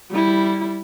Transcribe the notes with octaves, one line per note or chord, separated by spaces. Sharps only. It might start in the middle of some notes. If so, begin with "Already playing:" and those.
G3 E4